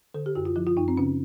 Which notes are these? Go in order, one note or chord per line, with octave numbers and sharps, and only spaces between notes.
D3 A4
G4
F#2 F#4
F4
F3 E4
F4
F#2 D#4
C4
C#3 C#4